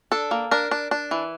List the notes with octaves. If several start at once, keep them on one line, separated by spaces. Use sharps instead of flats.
D4 A4
A#3
D4 A#4
D4
D4
E3